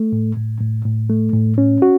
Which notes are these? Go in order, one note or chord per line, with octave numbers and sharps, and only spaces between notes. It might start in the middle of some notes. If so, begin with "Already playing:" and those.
Already playing: A3
A2
A2
A2
A2
A3
A2
C#4
F#4